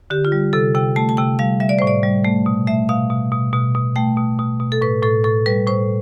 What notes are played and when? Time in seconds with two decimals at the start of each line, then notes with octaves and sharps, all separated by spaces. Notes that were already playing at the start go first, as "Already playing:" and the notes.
0.10 D3 G4
0.25 F4
0.32 G3
0.53 C3 A4
0.75 C3 G5
0.96 A3 A5
1.09 A5
1.17 C3 G5
1.39 G3 F5
1.60 G3 E5
1.69 D5
1.79 A2 C5
1.87 D5
2.03 G3
2.25 A3
2.46 B2
2.67 A3 E5
2.89 B2 F5
3.10 B2
3.32 B2
3.53 B2
3.75 B2
3.96 A3 G5
4.17 B2
4.39 B2
4.60 B2
4.72 A4
4.82 A2 B4
5.03 A2 A4
5.24 A2 A4
5.46 G3 B4
5.67 A2 C5